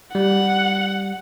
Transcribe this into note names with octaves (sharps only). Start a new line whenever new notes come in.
G3 F#5